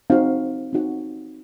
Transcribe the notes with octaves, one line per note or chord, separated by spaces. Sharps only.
C4 D#4 F#4 F5
C4 D#4 F#4